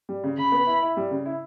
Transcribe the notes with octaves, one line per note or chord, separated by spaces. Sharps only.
G3
C#3
C#3 B5
B3
E4
E4
G3
C#3
E4